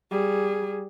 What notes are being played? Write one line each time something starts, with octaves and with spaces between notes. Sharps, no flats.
G3 G#4